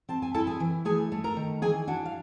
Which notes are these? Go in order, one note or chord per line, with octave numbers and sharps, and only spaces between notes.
C4 A5
G#5
E4 A4 A5
G#4 G#5
E3
A3 G#4 G#5
A3
A#4 A#5
D#3
E3 G#4 G#5
D4 F#4 F#5
F5